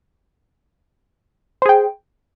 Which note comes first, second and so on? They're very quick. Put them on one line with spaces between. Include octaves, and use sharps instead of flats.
C5 G#4 G5